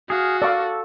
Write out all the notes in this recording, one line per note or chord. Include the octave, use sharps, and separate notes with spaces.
F#4 G#4 F5
A4 D5 F5 C#6 E6